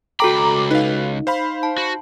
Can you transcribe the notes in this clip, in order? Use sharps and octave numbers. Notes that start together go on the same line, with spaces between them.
C#2 F#4 A4 G5 A#5 B5 D6
D#4 B4 F5
C5 F5 B5
A5
F#4